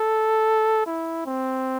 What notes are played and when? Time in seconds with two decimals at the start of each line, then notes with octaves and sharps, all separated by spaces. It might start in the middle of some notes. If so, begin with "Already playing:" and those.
Already playing: A4
0.86 E4
1.26 C4